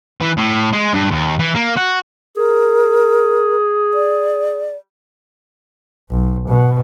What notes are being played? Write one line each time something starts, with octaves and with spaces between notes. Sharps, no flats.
E3
A2
G#3
G2
D#2
E3
A#3
F#4
G#4 A#4
D5
B1
B2